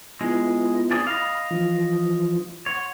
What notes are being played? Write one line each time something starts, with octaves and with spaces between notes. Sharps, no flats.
G#3 B3 E4 F4
C4 G#4 D5
D#5 F5 B5
E3 F3 F4
C#5 F#5 C6